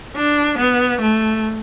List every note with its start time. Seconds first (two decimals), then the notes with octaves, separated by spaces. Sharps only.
0.16 D4
0.58 B3
1.01 A3